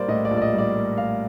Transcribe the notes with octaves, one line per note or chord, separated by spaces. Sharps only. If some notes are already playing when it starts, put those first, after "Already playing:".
Already playing: A#1 G3 A#3 C5 D5
A2 D#5
D5
A#1
D5
D#5
G3
D5
A#3
A2 F5